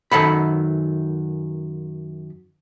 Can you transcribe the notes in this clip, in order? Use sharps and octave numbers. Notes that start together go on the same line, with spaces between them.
F#2 D#3 A4 F#5 B5